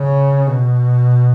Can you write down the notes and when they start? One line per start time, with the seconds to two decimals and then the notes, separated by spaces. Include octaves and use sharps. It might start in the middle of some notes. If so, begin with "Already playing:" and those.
Already playing: C#3
0.47 B2